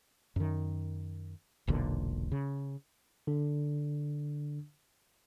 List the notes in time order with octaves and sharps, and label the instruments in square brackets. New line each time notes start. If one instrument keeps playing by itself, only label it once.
[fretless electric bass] F#2 D#3
E1 B1 A#2 D3
C#3
[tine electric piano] D3 D4